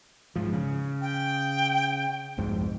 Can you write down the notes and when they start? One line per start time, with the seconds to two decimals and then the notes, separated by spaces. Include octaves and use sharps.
0.36 G#2 F3
0.53 C#3
1.02 G5
2.38 C2 F2 G#2